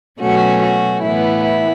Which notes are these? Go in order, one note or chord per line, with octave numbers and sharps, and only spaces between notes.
B2 F#3 A3 C#4 F#4
F#4
A2 E3 B3 E4
E4